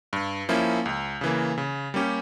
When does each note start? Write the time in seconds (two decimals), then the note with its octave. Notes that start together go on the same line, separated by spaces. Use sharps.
0.13 G2
0.49 F3 A#3 C#4 E4
0.86 C#2
1.21 C#3 E3 A#3
1.58 C#3
1.94 G3 A#3 C#4 G4